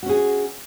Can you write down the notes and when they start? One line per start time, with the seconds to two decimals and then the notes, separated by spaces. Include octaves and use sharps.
0.03 F#4
0.06 C#4
0.09 G#4